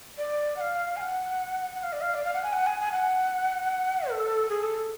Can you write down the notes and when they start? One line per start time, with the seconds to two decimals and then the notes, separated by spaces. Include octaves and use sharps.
0.18 D5
0.57 F#5
0.61 F5
0.97 G#5
1.01 F#5
1.75 F#5
1.83 F5
1.93 D5
2.01 F5
2.15 D5
2.24 F5
2.34 F#5
2.43 G#5
2.53 F#5
2.67 G#5
2.80 G#5
2.92 F#5
4.10 A4
4.49 G#4
4.63 A4